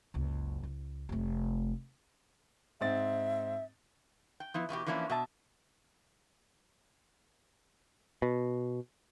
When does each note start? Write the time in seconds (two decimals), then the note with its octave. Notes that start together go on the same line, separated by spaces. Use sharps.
0.14 F#1 C#2
0.63 C#2
1.09 F1 A3
2.81 G#2 C4 E5 A6
4.40 G5
4.54 F3 B3 E4
4.69 E2 B2 F4 G4
4.86 E3 F3 A#3 C#4 D4 E4
5.10 B2 E5 A5
8.22 B2